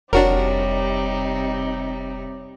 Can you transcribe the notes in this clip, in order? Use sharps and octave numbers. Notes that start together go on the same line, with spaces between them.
F1 C3 G3 D4 D#4 F#4 A#4 C#5